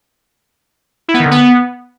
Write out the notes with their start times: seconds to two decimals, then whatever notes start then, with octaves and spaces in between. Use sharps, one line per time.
1.08 E4
1.14 B3
1.20 D#3
1.26 D3
1.31 B3